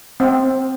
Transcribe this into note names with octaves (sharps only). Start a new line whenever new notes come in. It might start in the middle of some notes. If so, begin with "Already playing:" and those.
C4